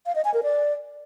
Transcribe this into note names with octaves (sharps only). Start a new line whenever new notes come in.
F5
D#5
G#5
A#4
D5